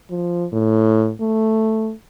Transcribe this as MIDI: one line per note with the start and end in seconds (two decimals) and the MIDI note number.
0.10 0.46 53
0.53 1.12 45
1.21 1.93 57